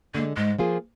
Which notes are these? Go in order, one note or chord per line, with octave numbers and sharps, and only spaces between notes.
D3 G#3 A#3
G#2 G#3
F3 A#3 F4 G#4